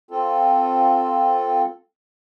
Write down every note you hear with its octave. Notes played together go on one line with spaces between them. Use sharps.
C4 F4 A4